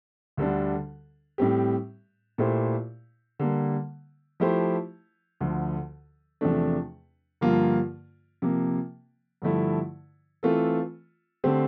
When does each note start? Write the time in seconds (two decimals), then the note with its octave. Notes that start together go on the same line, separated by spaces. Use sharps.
0.37 D2 D3 G3 D4
1.38 A2 G3 C4 G4
2.38 A#2 A3 E4 G4 C5
3.39 D3 G3 A#3
4.40 F3 A3 E4 G4 C5
5.41 D2 D3 F3
6.41 E2 C3 F3 A3 D4
7.41 G2 D3 F3 A#3 F4
8.42 C3 F3 A#3
9.42 G2 D3 F3 A3 E4
10.43 E3 A3 C4 F4 A4
11.44 D3 A3 C4 G4 C5